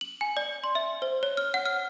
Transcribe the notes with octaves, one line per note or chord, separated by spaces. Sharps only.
F#7
G#5
D5
C6
E5
C5
C#5
F6
F#5
F6